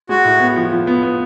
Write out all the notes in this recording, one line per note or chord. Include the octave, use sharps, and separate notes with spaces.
G#3 F#4
A2
B3
F3
F3
B3
B3